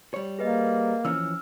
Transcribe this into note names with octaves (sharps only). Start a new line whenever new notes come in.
G3 C#5
A#3 G#4 B4 D#5
E3 F3 C#4 E6 F6